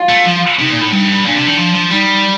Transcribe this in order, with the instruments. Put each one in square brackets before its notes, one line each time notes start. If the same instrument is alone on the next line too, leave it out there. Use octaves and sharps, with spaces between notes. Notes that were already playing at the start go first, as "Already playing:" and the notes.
Already playing: [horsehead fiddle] F4
[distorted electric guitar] A3
F3
[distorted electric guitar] C3 [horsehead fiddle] D#4
[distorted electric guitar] A#2
A2
G2
[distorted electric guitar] A#2 [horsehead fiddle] D4
[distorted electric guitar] C3
D#3
F3
F3
[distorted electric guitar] G3 [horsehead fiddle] D#4